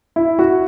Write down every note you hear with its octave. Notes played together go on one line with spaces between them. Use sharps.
E4
F#4